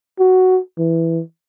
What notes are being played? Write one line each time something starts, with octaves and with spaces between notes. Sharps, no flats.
F#4
E3